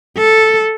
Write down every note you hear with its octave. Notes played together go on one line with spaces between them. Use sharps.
A4